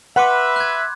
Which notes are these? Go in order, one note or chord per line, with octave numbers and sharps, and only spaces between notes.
B4 E5 F#5 B5 C6 D6
F#6 G#6